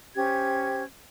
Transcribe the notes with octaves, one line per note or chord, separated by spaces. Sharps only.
C#4 G4 C5 G#6